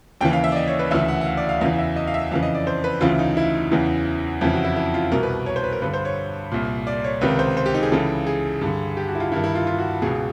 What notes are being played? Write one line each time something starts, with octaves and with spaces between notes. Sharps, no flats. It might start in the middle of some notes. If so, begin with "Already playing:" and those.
D#2 C#3 E3 G5
F5
E5
D5
D#5
C#5
B4
D2 C#3 E3 E5
F#5
F#5
F5
D5
F5
E2 C#3 E3 F5
E5
D#5
F5
E5
F2 C#3 E3 F5
D#5
D5
C5
B4
D2 C#3 E3 F4
D#4
E4
E2 C#3 E3
F2 C#3 E3 E4
F#4
E4
E4
F4
C2 B2 A#4
B4
C#5
C5
B4
A#4
G2 D3 B4
C5
C#5
C2 A#2
D5
C#5
C#2 C3 D#3 B4
C5
C5
G4
D#4
G#4
C#2 C#3 E3 A4
G#4
G2 D3
G4
F#4
E4
F4
G2 D#3 E4
E4
F4
F4
F#4
C#2 B2 G#4